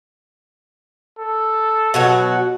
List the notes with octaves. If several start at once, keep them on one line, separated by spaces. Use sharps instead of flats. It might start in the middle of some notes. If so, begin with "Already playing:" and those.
A4
B2 F#3 F#4